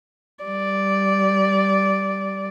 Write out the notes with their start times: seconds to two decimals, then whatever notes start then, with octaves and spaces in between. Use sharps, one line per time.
0.45 G3 D5